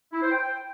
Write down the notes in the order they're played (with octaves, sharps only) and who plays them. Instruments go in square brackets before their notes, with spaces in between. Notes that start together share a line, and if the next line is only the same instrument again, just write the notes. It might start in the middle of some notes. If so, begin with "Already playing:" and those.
[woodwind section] E4
C5
G5